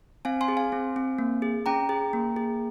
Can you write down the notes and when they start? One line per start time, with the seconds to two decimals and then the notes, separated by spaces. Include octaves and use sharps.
0.25 C4 F5 G#5
0.41 G#5 C6
0.48 G#4
0.57 F5 G#5
0.72 C4
0.96 C4
1.19 A#3
1.42 G#4
1.66 C#4 G5 A#5
1.89 G#4
2.13 A#3
2.36 G#4